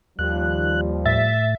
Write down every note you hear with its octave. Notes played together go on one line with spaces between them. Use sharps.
D#2 F3 G3 F#6
A2 E5 A6